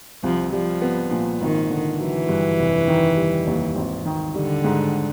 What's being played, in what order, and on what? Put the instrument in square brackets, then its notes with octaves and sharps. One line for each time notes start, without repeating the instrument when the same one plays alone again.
[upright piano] C2 [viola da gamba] F3
[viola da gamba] F3 [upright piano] G3
[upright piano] B3
A#2
[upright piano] G#1 [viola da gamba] D#3
[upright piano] D3
[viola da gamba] E3 [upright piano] F#3
[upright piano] G2
F1
D#3
G3
D#2
G#1
D#3
[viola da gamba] D3 [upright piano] G3
[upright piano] G#2